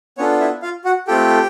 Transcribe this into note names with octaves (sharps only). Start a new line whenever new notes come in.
B3 C#4 D4 F4 A4 C#5
E4 E5
F4 F5
F#4 F#5
A3 C4 F4 G4 A4 G5